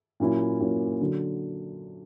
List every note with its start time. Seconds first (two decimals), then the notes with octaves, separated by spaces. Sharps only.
0.20 A#2 F#3 A#3 C#4 E4
0.60 A#2 F#3 A#3 C#4 E4
1.01 D3 F#3